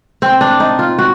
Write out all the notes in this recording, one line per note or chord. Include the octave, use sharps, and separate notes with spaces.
C4
D4
D#4
F4
F#4